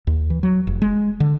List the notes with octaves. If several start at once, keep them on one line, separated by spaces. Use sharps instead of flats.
D#2
E3
F#3
F1
G#3
D3